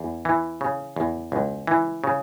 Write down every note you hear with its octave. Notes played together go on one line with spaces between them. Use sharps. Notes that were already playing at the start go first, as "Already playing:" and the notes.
Already playing: E2
E3
C#3
E2
C#2
E3
C#3